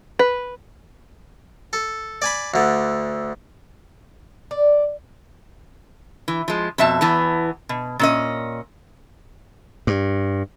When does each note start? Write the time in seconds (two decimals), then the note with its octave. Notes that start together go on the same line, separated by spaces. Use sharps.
0.19 B4
1.73 A4
2.22 D5 G#5 B5
2.54 D2 D3
4.51 D5
6.28 E3
6.48 F3 G#3
6.78 F2 B2 E5 A5
7.01 E2 E3 B3 A5
7.69 B2
7.99 A#2 C#4 D#5
9.87 G2